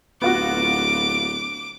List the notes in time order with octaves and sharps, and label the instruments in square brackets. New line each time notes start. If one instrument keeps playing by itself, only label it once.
[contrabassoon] D1 [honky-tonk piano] B3 F4 F#4 [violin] D6